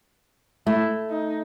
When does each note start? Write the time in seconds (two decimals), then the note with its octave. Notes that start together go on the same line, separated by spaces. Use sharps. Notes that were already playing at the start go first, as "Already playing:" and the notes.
0.67 A3 E4
1.10 D#4